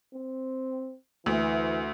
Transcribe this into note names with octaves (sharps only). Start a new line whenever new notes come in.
C4
D2 E3